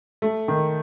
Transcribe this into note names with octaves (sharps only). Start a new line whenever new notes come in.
A3
D#3